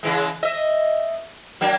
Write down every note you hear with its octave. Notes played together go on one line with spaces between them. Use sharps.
C#3 E3 G#3
D#5 E5
F#3 A#3 D4